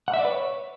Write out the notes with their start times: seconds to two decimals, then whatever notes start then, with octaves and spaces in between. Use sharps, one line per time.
0.08 F#5
0.14 E5
0.19 D5
0.25 B4
0.30 C#5